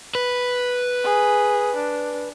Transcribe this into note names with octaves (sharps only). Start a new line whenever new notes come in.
B4
G#4
D4